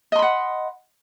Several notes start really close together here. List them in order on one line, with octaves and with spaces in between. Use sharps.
D#5 C6 B5 F#5